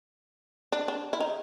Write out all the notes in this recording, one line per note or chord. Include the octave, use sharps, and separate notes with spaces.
D4
D4
E4
D#4